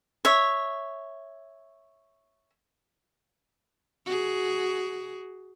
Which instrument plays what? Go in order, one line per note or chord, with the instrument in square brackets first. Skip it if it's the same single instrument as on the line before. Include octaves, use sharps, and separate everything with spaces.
[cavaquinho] C#5 E5
[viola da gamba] F#4 G#4